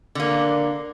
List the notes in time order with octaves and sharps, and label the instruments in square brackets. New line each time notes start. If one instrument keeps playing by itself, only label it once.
[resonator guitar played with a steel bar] D3 A#3